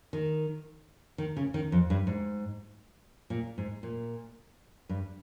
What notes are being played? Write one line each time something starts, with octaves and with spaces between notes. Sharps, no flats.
D#3
D#3
C#3
D#3
F2
G2
G#2
A#2
G#2
A#2
G2